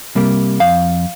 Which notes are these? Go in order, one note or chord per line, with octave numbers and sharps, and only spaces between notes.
C3 G3 A#3
F2 F5